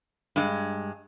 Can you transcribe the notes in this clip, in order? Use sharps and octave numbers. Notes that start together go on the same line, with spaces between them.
G2 G#3